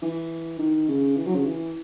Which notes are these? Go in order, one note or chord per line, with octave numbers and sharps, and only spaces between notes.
E3
D#3
C#3
E3
F#3
C#3
E3